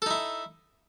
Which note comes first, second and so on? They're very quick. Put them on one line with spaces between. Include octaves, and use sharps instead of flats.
A4 D#4 E4